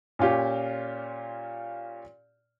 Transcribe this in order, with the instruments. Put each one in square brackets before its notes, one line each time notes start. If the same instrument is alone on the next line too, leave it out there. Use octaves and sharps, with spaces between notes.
[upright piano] A#2 C#4 F4 G4